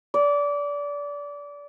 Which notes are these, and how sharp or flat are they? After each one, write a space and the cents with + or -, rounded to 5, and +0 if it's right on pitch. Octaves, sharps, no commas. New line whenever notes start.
D5 -25